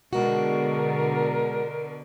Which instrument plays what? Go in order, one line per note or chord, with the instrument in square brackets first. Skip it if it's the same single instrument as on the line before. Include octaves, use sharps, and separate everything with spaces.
[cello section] B2 D3 [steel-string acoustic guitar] G#3 F#4 [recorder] A#4